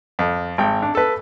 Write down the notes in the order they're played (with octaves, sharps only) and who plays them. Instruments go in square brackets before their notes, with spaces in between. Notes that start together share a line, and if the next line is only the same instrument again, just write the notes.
[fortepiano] F2
G#1 G5
D4
A4 B4